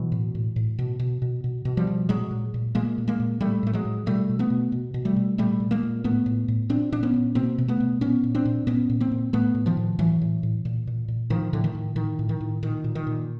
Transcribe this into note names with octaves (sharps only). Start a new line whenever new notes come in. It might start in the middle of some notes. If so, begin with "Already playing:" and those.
Already playing: B2 E3 F#3
A2
A2
A2
B2
B2
B2
B2
B2
F3 G3
B2
A#2 F#3 G#3
A#2
A#2
A#2 G#3 A#3
A#2
G#3 A#3
A#2
A2 G3 A3
A2 A3
F#3 G#3
A2
B2 G3 A3
B2
A3 B3
B2
B2
B2
G3 A3
B2
A#2 G3 A3
A#2
G#3 A#3
A#2
A2 A3 B3
A2
A2
A#2 C4 D4
A#2 D4
B3 C#4
A#2
B2 A#3 C4
B2
A3 B3
B2
A#2 B3 C#4
A#2
C4 D4
A#2
A#2 B3 C#4
A#2
A#3 C4
A#2
A2 A3 B3
A2
D#3 F3
A2
A2 E3 F#3
A2
A2
A#2
A#2
A#2
A2 D#3 F3
A2 D3
D#3
A2
A2 D#3
A2
D#3
A2
A#2 D#3
A#2
D#3
A#2